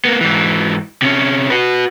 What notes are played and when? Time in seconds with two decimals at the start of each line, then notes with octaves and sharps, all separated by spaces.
0.05 A#3 B3
0.21 G#2 E3
1.02 C3 C#4
1.50 F#4 B4